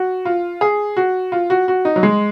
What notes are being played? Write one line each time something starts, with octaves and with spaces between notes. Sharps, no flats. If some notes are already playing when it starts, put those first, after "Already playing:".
Already playing: F#4
F4
G#4
F#4
F4
F#4
F#4
D#4
F#3
G#3